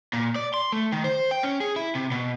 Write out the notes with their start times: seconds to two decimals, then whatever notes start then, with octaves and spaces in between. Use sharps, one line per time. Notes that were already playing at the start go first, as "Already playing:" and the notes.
0.13 A#2
0.36 D5
0.54 C6
0.72 A3
0.92 D#3
1.04 C5
1.31 G5
1.43 C#4
1.60 G#4
1.76 E4
1.95 C3
2.12 B2